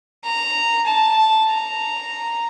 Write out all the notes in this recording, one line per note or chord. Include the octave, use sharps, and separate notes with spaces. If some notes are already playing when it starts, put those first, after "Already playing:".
A#5
A5
A#5